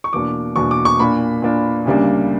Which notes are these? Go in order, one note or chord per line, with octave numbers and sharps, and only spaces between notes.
C#6
E2 B2 A#3 D4 D6
E2 B2 A#3 D4 C#6
D6
C#6
A#2 A#3 D4 B5
A#2 A#3 D4
D2 C#3 G3 A#3 D4